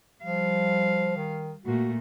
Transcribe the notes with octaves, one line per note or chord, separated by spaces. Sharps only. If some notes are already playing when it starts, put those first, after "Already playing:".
F3 G3 F5
D#3
A#2 A3 F#4